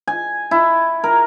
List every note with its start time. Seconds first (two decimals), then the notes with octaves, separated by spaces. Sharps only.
0.07 G#5
0.51 E4
1.04 A#4